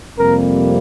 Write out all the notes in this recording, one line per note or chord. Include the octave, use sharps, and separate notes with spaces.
F2 C3 G3 A#3 A#4